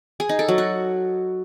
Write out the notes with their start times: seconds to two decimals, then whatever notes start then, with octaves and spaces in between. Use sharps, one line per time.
0.20 G#4
0.29 D#4
0.39 A4
0.48 F#3
0.58 F#4